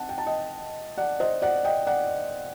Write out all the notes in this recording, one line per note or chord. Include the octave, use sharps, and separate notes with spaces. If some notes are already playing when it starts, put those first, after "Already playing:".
Already playing: C4 F#5 A5
G5
A5
D#5 G5
D5 F#5
C5 D#5
D5 F#5
D#5 G5
D5 F#5